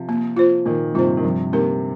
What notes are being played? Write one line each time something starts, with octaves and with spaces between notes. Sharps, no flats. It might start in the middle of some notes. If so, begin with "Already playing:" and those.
Already playing: C3 F3
A#3
F4 C5
A#2 D#3 A#3
G2 C3 F4 C5
D#3
G2 C3 F3
G2 C3 A#3 D#4 A#4